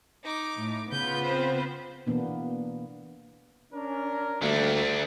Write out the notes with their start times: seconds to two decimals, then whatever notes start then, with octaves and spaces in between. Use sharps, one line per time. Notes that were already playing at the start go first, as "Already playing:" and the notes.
0.24 D#4 D6
0.57 A2
0.92 C#3 B3 F4 B4 G6
1.24 C4 C5
2.07 B2 E3 A#3 B3 D4
3.73 C#4 D4 A#4
4.42 D2 D3 G3 A3 A#3